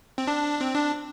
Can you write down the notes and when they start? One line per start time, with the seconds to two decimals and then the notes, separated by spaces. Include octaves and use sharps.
0.18 C4
0.27 D4
0.61 C4
0.74 D4